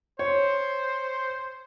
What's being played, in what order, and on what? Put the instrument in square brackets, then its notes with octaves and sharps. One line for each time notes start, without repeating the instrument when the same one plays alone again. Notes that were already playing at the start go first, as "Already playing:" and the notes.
[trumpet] C5 [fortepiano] C#5